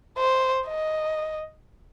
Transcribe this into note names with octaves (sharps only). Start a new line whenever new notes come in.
C5
D#5